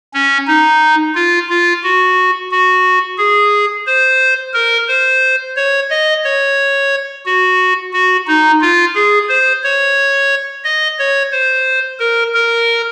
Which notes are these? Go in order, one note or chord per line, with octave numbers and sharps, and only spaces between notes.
C#4
D#4
F4
F4
F#4
F#4
G#4
C5
A#4
C5
C#5
D#5
C#5
F#4
F#4
D#4
F4
G#4
C5
C#5
D#5
C#5
C5
A#4
A#4